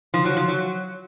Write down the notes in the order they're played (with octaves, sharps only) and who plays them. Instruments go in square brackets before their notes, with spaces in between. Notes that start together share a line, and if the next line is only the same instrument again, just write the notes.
[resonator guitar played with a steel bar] F3
F#3
F3
F#3